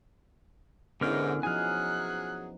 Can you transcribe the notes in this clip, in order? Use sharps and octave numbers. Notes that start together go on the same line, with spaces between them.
E2 G#2 D3 B3 C#4 E4 A#4 F6
F3 F#3 D#4 G#4 G#5 F6 F#6